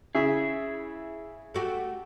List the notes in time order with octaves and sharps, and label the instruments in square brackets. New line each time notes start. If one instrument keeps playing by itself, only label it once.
[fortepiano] C#3 E5 [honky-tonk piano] E4 [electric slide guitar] G#4
[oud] A3 F#4 G4